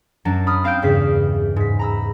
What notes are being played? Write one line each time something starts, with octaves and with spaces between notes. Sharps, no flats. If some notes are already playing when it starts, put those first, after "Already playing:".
F#2 F#3 D4
B5 D#6 F6
C4 F5 F6 G6 D7
E2 G2 C#3 G#4 B6 C7
G#2 B6
A#5 B5 E6